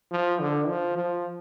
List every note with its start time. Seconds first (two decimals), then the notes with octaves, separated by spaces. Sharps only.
0.12 F3
0.40 D3
0.68 F3
0.97 F3